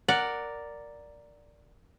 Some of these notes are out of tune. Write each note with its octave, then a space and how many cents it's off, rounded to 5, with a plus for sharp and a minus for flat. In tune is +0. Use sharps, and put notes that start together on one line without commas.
A#4 +0 D5 +0 F#5 +0